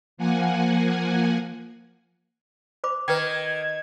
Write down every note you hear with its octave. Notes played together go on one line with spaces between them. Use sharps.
F3 A#3 F#5 G#5
C5 B5 D6
D#3 B4 G5 G#6